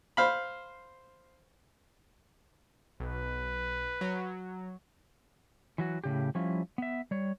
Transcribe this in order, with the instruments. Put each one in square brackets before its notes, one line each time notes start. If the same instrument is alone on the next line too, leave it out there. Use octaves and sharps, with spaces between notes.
[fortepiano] C5 F5 B5
[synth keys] B1 [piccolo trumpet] B4
[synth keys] F#3
[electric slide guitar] E3 F#3 F#4
A2 C#3 G4
F3 G3 C#4 E4 F4
B3 E5
G3 C#5